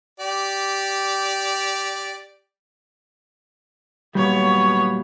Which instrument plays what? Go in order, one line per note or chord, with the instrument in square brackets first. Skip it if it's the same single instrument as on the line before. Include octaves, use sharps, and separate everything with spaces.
[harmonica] G4 D5
[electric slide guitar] A#2 F#3 G3 [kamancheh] B3 C#5